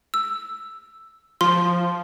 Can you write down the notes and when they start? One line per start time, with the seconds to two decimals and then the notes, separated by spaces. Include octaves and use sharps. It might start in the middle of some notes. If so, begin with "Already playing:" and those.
0.14 E6
1.41 F3 C6